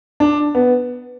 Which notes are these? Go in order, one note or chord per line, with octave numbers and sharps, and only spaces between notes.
D4
B3